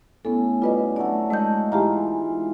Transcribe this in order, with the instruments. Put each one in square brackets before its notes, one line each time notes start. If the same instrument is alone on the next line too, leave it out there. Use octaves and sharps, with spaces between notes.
[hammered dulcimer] A2 C#4 [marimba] B3 A4
[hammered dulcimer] B2 G3 [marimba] F4 B4 D#5
[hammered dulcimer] D3 F#3 A3 [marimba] D5 F#5
[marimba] G#3 G6 [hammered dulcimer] A4 D#5 F#5
[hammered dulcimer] G#2 E3 F4 [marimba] G4 A5 A#5